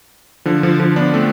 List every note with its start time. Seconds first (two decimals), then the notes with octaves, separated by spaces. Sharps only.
0.45 D3 F3
0.63 D3 F3
0.80 D3 F3
0.96 B3 D4
1.14 A3 C4